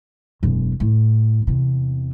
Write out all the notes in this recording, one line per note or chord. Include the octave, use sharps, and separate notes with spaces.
E1 F#2
A2
E2 C3